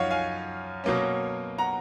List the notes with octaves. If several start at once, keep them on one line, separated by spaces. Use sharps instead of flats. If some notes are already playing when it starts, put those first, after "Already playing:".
Already playing: F#2 F3 D#4 C#5 F5 F#5
F5 G#5
B2 F#3 A#3 C#4
F#5 A#5